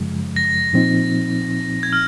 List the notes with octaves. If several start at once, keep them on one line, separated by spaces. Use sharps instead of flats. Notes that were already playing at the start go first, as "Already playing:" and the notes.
Already playing: F#2 C#3 F3 G#3
A#6
A#2 F3 C4 D#4
G#6
F6